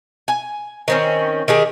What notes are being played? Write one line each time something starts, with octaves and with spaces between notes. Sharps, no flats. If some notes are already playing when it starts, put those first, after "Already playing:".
G#5
D#3 C4 C#4
D#3 G4 G#4